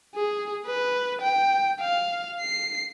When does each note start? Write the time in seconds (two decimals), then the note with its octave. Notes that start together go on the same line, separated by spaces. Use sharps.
0.15 G#4
0.67 B4
1.21 G5
1.80 F5
2.41 C7